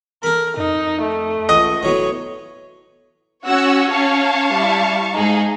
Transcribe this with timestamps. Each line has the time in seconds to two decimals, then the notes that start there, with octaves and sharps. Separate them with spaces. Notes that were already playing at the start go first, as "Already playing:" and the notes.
0.23 A4 A#4 B5
0.57 F2 D#4
1.02 A3
1.49 G#1 C#2 D#5 F#5 C#6
1.83 E1 A2 F#3 B3 C#5
3.45 C#4 F#4 C#5 F#5 E6
3.91 F5 A5 C#6
4.52 G3 E4
5.12 G#2 D#4 G#4